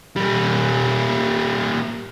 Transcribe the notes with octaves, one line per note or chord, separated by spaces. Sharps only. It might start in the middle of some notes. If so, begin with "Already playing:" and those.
G3 A#3